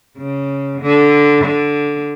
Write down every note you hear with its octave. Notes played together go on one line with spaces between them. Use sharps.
C#3
D3
D3